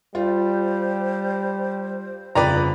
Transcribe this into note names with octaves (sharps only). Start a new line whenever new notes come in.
G3 F4 C5
G1 F2 C#3 B4 D5 G5 A#5